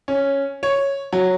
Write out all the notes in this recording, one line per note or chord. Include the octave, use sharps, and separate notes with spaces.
C#4
C#5
F#3